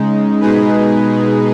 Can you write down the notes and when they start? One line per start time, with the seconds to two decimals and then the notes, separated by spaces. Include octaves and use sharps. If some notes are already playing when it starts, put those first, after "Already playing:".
Already playing: C#3 G#3 D#4
0.41 B2 G#3 D#4 G#4 B4